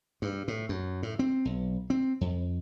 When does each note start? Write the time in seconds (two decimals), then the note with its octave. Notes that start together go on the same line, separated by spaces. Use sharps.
0.22 G2
0.48 A2
0.69 F#2
1.03 A2
1.19 C4
1.45 B1
1.90 C4
2.21 F2